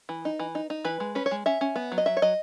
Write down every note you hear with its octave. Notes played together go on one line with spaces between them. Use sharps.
E3
D#4
E3
D#4
D#4
E3 B4
G#3
C#4 B4
C#5
G#3
C#4 E5
C#4
B3
F#3
D#5
F#3 E5
C#5
F#3 D#5